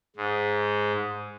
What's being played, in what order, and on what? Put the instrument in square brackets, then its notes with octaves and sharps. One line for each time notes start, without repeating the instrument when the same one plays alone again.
[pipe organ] G#2